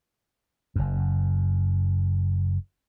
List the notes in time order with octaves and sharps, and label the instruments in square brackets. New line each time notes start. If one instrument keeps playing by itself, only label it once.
[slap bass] F#1 F#2